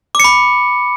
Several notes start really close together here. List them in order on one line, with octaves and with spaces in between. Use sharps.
D6 C#7 B5